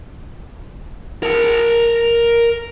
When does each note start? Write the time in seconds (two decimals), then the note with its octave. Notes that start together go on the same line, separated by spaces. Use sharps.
1.23 A#4 A5